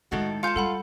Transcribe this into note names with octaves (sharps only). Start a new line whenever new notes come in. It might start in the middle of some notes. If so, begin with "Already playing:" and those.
A2 D#3 G#3 F#4 A4
F4 F5 G#5 A5 G6 C#7
G3 A4 F#5 B5